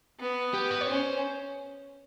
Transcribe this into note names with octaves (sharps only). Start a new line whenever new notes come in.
B3
G4
B4
C#5
C#4 C5